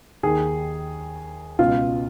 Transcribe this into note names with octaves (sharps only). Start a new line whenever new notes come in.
D#2 D#3 G#4
C#2 B2 F4